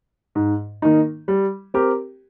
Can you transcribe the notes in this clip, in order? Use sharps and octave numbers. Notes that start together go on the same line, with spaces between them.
G#2
D#3 A#3 D#4
G3
C4 G4 A#4